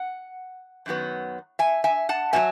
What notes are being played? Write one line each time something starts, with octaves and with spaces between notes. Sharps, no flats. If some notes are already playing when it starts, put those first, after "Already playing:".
Already playing: F#5
F#2 D#3 F#3 B3
E5 G#5
E5 G#5
F#5 A5
B2 F#3 E5 G#5